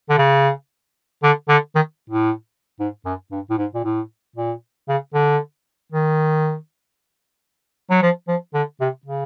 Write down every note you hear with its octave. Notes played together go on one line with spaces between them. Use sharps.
D3
C#3
D3
D3
D#3
A2
G#2
F#2
G2
A2
G#2
A#2
A2
A#2
C#3
D3
D#3
F#3
F3
F3
D3
C3
C#3